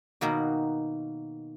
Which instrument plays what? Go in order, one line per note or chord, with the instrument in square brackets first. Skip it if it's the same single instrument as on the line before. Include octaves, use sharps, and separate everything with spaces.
[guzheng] B2 D#3 A#3 F#4